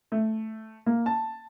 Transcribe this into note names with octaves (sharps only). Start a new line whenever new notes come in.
A3
A#3
A5